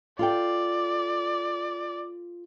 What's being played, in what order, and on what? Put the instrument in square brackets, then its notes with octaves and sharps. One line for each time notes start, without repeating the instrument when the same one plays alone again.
[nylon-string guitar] F4 A4 G5 [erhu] D5